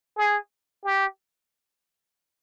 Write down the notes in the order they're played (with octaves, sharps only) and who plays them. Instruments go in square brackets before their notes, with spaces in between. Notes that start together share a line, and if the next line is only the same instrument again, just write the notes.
[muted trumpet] G#4
G4